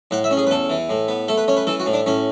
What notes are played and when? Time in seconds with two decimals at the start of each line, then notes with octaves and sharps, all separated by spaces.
0.11 A2 F#5
0.24 E5
0.31 C#4
0.37 G#4
0.47 B4
0.50 E2 A4
0.70 E3
0.89 A2
1.08 B3
1.28 A3 A4
1.38 B4
1.48 C#4 C#5
1.57 B4
1.67 E3 A4
1.80 F#4
1.86 A2
1.93 D4
2.06 A2 C#4